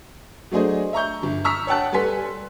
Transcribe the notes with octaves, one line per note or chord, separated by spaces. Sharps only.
F#3 A3 D4 G#4 C5 D#5
E5 A#5 C#6 G6
G1
A#5 C#6 E6 F6 B6
C#5 F#5 G5 A5 F#6
G3 A4 B4 G#5 C6 B6